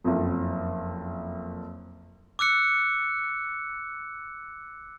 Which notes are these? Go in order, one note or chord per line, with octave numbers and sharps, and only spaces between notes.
F#1 F2
D6 E6 F#6 C#7